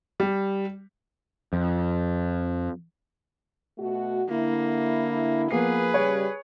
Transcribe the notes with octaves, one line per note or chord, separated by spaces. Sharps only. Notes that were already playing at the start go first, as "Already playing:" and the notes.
G3
F2
B2 A3 F#4
D3 A#3 E4
F3 A#3 B3 G#4 B4 C7
C#3 G3 C#5